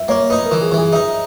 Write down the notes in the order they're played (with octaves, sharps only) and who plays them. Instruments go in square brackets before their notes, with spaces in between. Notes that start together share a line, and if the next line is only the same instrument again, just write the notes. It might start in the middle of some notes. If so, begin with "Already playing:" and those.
Already playing: [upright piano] E5
[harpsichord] A#3 [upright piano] C#5
[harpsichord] D#4 [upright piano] B4
[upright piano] A#4
[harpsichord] E3
[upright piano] G#4
[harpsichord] E3
[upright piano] G#4
[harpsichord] D#4 [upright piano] E5